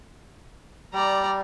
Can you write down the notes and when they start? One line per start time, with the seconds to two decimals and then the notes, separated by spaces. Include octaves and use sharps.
0.94 G3 D5 A#5